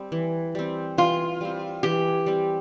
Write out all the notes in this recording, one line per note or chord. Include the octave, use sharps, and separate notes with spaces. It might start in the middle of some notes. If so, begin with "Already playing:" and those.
Already playing: G3 C4
E3
G3 C4
E3 F4
G3 C4
E3 G4
G3 C4